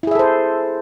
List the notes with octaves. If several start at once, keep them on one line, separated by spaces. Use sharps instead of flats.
E4 G#4 A4 C5 E5